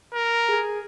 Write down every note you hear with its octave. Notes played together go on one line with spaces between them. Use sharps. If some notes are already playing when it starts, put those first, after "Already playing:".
A#4
G#4